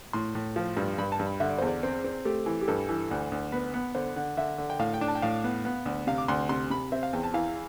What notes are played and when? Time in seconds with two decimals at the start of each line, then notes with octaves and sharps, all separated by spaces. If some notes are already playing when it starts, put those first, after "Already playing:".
0.13 A2 C6
0.35 A2
0.56 F3
0.77 G2
0.98 G2 B5
1.12 A5
1.19 G2
1.26 B5
1.40 D3 E5
1.49 D5
1.58 E2 C5
1.68 D5
1.83 C4
2.04 C4
2.25 A3 G4
2.46 E3
2.61 G4
2.68 G2 A4
2.89 E3
3.11 D2
3.32 D2
3.52 B3 B4
3.74 B3
3.95 D3 C5
4.16 D3
4.37 D3 E5
4.58 D3
4.70 G5
4.79 A2 F5
4.94 G5
5.01 D4
5.08 A5
5.15 G5
5.22 A2 F5
5.44 B3
5.65 B3
5.85 D2
6.07 C3 F5
6.18 D6
6.28 D2 C6
6.49 C3 C6
6.70 C3 B5
6.92 C4 E5
7.03 F5
7.13 E2 G5
7.24 A5
7.34 E3 F5